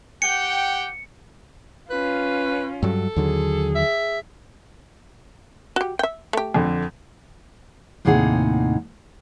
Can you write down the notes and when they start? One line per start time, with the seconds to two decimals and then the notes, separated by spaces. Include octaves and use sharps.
0.22 G4 F#5 G5 C#7
1.90 C#4 F4 B4
2.83 G2 F#3 A4
3.16 D#2 D3 F#3 G#4
3.75 E5
5.76 F#4 G4
5.99 E5 G5
6.33 A3 G4
6.54 F2 D3
8.05 D#2 A2 C3 D#4 G#4 F#5